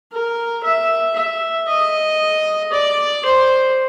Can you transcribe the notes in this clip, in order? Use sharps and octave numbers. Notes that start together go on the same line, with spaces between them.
A#4
E5
E5
D#5
D5
C5